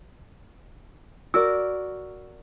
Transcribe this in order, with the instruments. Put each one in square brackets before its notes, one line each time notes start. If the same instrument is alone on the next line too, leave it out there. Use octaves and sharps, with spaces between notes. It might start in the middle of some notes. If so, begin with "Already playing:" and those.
[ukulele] F#4 A#4 D5 [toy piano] E6